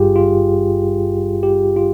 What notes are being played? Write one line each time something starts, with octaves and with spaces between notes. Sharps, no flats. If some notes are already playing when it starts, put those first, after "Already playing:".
Already playing: G#1 G2 G3 F4 G4 G#4
F4
G4
F4